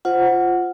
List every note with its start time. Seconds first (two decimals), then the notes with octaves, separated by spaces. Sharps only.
0.05 F4 C5 F#5